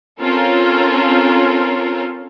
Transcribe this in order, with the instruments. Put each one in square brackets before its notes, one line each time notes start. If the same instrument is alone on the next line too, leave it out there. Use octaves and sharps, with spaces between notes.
[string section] C4 C#4 F4 A4 A#4